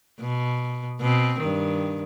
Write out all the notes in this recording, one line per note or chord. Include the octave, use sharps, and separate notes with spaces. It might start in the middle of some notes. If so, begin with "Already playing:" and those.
B2
B2 C4
G2 D#3